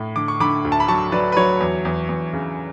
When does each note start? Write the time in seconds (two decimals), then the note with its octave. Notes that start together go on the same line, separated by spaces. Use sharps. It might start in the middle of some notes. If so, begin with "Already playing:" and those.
Already playing: A2
0.16 D3 D6
0.28 C#6
0.40 D3 B5 D6
0.65 D2
0.72 A5
0.80 B5
0.88 F#3 A5 C#6
1.12 F#3 B4 D5
1.32 B4
1.37 F#3 C#5
1.61 E2
1.85 E2
2.09 E2
2.33 C#3